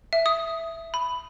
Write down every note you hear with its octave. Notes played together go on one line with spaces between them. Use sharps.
E5
D#6
B5